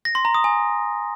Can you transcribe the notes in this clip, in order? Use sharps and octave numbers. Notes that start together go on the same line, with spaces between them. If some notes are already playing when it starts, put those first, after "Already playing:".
A#6
C6
A#5
D#6
G#5